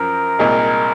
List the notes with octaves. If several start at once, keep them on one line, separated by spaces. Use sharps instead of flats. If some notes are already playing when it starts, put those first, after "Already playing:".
Already playing: F#2 F3 A#4
C2 A#2 G#3 D#4